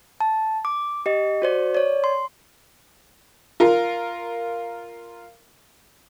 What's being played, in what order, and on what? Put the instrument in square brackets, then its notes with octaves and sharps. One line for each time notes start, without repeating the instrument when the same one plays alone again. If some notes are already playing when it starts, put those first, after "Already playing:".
[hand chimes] A5
D6
G4 D#5
F#4 C5 D5
C#5 D5
C6
[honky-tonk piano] F4 A#4